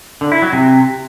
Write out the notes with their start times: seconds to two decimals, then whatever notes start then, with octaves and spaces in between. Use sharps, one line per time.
0.21 D3
0.32 E4
0.42 F#3
0.53 C3